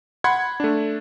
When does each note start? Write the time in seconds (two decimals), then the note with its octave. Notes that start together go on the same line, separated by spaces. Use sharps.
0.24 F#5 B5 C6 G#6
0.60 A3 D4